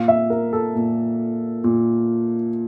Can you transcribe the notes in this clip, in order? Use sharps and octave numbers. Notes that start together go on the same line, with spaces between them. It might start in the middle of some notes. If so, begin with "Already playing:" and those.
Already playing: A#2 F5
E5
A#4
A4
A#2
A#2